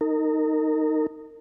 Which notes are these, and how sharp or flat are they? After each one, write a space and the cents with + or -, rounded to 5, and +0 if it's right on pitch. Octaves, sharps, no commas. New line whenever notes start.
D#4 +0 A#4 -30